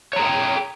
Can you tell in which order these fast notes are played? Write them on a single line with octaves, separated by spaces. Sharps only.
C#5 A#5 G#4 F#5 G5